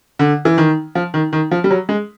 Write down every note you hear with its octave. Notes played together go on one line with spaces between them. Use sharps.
D3
E3
D#3
F3
D#3
D#3
F3
G3
F#3
G#3